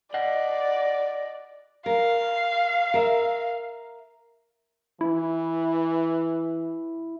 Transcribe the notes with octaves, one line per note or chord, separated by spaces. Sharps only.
D5 D#5 F#5
A#4 F5
A#4 E5
E3 E4